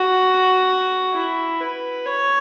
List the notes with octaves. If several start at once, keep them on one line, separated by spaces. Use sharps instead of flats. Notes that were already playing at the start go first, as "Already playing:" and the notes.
Already playing: F#4
E4
B4
C#5